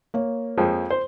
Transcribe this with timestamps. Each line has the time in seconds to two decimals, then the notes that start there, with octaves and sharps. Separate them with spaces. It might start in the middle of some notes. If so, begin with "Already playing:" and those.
0.14 A#3 C#5
0.57 F2 F3 G#3
0.90 C5